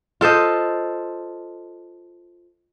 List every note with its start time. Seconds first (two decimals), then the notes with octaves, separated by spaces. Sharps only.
0.21 F4 A4 C5 D#5